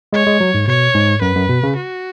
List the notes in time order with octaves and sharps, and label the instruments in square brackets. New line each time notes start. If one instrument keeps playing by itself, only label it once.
[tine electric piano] G#3 [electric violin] C#5
[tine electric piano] G#3
F#3
G#2
[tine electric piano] B2 [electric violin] C#5
[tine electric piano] G#2
[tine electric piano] F#2 [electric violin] B4
[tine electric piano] F#2
B2
C#3
[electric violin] F#4